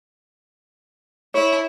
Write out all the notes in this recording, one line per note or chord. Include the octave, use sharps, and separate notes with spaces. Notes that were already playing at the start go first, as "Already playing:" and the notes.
E4 C#5